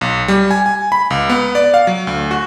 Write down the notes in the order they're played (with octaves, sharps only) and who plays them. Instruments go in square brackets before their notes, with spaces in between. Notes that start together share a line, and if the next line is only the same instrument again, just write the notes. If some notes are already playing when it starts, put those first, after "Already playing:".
[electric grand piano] B1
G3
G#5
G#5
B5
C#2
B3
D5
F5
F#3
D2
F#4